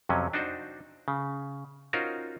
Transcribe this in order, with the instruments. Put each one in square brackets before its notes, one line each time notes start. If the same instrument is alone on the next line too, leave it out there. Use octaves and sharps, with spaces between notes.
[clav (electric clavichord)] F2 C3 F#3 C#4
D4 D#4 F#4 C5
C#3
C#4 D#4 F4 F#4 A#4 C5